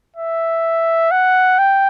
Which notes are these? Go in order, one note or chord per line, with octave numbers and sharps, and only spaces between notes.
E5
F#5
G5